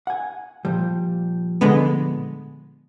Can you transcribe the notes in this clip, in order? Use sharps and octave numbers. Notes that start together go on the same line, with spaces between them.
F#5 G#5
A#2 F3 G3
D3 G#3 B3